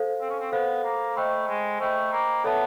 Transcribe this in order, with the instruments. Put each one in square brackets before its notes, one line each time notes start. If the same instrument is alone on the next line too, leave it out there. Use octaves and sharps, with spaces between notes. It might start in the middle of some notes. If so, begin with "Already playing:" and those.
Already playing: [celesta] A4 C5 F5
[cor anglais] C4
C#4
C4
[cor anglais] B3 [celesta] A4 C5 F5
[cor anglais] A#3
[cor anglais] A3 [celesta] C5 D#5 G5 B5
[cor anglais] G#3
[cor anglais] A3 [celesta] C5 D#5 G5 B5
[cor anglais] A#3
[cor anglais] B3 [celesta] A4 C#5 E5 A5